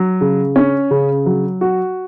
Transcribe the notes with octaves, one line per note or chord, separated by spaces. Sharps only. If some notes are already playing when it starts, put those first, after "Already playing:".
Already playing: F#3
C#3
C#4
C#3
F#3
F#4